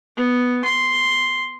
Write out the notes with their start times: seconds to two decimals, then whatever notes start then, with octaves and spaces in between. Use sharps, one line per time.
0.17 B3
0.65 C6